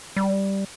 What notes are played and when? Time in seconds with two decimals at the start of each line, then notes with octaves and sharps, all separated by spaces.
0.16 G3